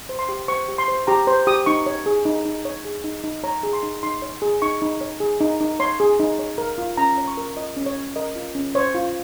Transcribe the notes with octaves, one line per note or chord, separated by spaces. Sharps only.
C5
C6
G4
C5 C#6
G4
C6
C5
G4 A#5
C5
G4 D#6
D#4 C#6
C#5
G#4
D#4
D#4
C#5
G#4
D#4
D#4
C#5 A#5
G#4
C6
D#4
D#4 C6
C#5
G#4
D#4 C#6
D#4
C#5
G#4
D#4
D#4
C#5 C6
G#4
D#4
C#5
A#4
F4
C#4 A#5
C#5
C#6
A#4
F4 D#5
C#4
C#5
C#5
A#4 D#5
F4
C#4
C5 C#5
F4